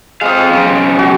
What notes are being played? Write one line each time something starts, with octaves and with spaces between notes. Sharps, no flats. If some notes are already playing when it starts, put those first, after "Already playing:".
G#3 C4 F5 D#6
B1 C#3
F#4